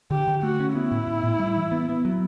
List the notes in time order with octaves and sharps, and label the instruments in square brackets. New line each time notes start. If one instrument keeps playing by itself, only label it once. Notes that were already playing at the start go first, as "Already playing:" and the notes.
[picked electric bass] D3 [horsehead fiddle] G4
[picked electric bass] D3
[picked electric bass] A3 [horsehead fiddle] F#4
[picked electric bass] C#4
[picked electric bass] B3 [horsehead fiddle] E4
[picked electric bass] A2
A2
A2
G3
E3
B3
B3
F#3